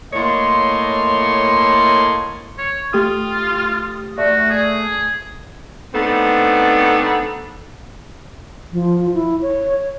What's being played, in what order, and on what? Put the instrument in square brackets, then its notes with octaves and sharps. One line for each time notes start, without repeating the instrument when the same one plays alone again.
[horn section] A2 A3 A#3 C#5 D#5 C6
[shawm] C#5
[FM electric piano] A3 G4 D#6 [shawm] F4
[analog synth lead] A3 [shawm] F#4 [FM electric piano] D5
[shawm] G#4
[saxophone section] A3 B3 C4 D4 D#4 A4
[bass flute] F3
E4
C#5